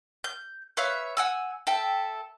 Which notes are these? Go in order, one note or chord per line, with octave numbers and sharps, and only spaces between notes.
G6
B4 C#5 E5 F5
F#5 G#5 E6
A4 E5 G5